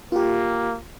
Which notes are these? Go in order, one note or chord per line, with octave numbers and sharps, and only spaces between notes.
A#3 F4 G4